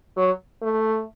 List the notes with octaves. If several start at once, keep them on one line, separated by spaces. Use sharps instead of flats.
F#3
A3